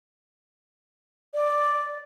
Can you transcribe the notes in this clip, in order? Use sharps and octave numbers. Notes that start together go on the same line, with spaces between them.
D5